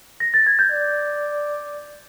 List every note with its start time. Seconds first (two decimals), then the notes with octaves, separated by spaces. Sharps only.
0.20 A#6
0.34 A6
0.47 G#6
0.59 G6
0.72 D5